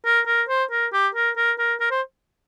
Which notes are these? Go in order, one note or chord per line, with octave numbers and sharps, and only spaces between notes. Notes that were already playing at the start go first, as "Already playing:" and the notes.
A#4
A#4
C5
A#4
G4
A#4
A#4
A#4
A#4
C5